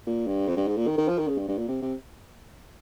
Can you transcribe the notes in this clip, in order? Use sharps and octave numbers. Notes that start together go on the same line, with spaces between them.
A#2
G2
F2
G2
G#2
A#2
D#3
D#3
F3
D#3
C#3
G2
G2
A#2
C3
C3